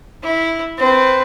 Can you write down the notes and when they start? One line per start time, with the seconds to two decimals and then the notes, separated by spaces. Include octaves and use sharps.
0.23 E4
0.78 C4 B4